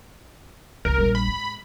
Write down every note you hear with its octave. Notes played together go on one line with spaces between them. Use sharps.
C2 F2 A#4
A#1 G3
B5
G#2